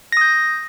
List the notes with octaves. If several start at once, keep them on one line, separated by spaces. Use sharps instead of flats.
D#6 G6 A#6